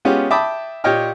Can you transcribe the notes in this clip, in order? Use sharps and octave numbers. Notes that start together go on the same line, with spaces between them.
G#3 B3 C#4 F4 G4
E5 G5 A5 B5 D6 D#6
A#2 G4 C#5 D#5 G5 F6